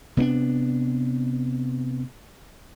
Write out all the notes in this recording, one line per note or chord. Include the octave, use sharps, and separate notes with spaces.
C3 B3 C4 D4